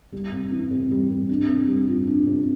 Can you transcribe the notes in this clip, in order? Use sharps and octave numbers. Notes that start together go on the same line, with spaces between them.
G3
C3
E3
C3
G3
C3
D4
C3
G3
F4
D4
C3